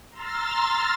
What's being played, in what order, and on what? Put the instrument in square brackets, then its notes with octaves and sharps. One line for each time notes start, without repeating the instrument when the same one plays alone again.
[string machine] A#5 C6 E6 F6 A6